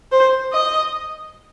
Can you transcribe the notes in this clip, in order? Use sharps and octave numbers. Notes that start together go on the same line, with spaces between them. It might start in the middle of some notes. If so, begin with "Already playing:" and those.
C5
D#5